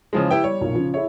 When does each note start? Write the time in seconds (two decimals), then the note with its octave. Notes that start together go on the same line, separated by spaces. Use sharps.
0.13 C#3 E3 F3 G#3
0.31 E4 G4 B4 G5
0.44 G3 C#5
0.61 B1 A#2
0.75 C#3 F3
0.94 E4 G#4 C#5 E5